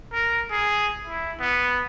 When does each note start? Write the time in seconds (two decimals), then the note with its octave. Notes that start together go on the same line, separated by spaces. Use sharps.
0.12 A#4
0.51 G#4
1.06 E4
1.40 B3